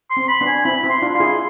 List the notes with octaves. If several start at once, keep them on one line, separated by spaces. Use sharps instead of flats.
C6
C4
B5
B3 D4
G#5
C4 E4 B5
C4 E4
C6
D4 F4
F4 C6
E4 G#4